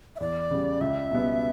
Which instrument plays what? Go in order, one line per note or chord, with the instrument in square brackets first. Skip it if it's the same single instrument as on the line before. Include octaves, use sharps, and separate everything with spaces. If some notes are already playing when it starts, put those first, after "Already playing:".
[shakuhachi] E5
[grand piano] E2 [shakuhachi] D5
[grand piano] C#3 G3
[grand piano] C#2 [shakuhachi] E5
[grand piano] B2 G3 B3